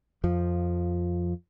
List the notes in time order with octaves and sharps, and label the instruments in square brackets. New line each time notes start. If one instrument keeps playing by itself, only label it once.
[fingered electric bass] F2 F3